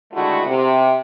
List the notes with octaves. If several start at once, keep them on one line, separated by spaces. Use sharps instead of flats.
D3 D#3 G#3 A3 E4 F#4
C3